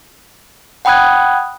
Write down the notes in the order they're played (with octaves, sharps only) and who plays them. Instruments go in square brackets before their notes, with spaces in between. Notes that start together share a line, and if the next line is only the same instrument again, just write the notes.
[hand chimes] F#5 G5 B5 D#6 F#6 G#6